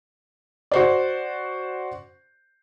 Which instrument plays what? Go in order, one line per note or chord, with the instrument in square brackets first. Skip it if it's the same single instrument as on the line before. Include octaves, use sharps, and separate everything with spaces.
[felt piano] F#4 C5 D5